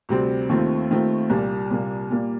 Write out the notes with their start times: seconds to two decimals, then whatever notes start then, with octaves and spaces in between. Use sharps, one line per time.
0.09 D2 C3 G3 C4
0.49 D#2 D#3 A3 C4 F4
0.90 D#2 D#3 A3 C4 F4
1.30 C2 A#2 G3 A#3
1.71 C2 A#2 G3 A#3
2.11 A#2 G3 A#3